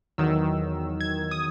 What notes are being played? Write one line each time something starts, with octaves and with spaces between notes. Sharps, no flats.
E2 D#3 F#3 E6
G#6
D#6